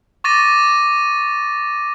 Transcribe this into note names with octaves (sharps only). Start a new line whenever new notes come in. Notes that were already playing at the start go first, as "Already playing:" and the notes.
C#6 D6 A6 A#6 D#7